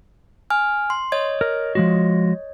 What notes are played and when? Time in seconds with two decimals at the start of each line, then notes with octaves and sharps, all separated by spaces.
0.50 G#5 F6
0.90 C6
1.12 C#5 D#5 G#6
1.41 A#4
1.75 F3 G#3 F#4